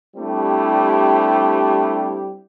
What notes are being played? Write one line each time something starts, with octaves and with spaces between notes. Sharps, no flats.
G3 A3 C4 D4 E4 G4